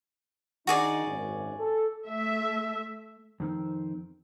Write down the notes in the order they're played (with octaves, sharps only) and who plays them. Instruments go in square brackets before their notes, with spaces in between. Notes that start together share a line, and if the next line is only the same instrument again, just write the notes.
[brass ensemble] D#3 D4 D#4 [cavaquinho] F#4 G#4 D5
[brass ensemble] G#1 F#2
A4
[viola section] A3 E5
[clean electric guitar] F2 D#3 C4